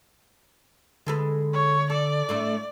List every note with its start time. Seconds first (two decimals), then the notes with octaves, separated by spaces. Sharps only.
1.06 D3 G#3 A4 B4
1.53 C#5
1.90 A4 D5
2.29 A2 A3 D4